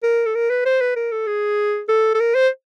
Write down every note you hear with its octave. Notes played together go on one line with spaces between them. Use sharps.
A#4
A4
A#4
B4
C5
B4
A#4
A4
G#4
A4
A4
A#4
C5